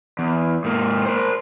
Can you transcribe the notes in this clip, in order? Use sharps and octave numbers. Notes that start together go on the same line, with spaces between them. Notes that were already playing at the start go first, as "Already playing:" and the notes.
E2
G#2 A#3
A#4 C5